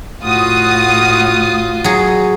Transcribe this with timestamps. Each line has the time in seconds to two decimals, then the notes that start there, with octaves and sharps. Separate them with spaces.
0.24 A2 F4 F#4 D#6
1.84 F#3 G#4